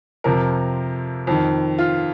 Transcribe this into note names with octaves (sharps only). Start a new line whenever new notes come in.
F2 C3 F3 A#4
F2 D#3
F4